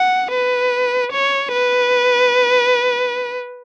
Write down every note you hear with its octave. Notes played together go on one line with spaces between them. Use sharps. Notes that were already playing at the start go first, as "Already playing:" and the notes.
Already playing: F#5
B4
C#5
B4